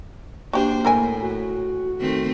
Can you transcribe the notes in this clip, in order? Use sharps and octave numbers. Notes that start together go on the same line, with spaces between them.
A#3 D4 F#4 G4 C5
A2 E3 A#4 G#5
F#4
D#3 A3 C4